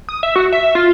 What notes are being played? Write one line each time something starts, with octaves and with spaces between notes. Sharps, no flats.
D#6
E5
F#4
E5
F4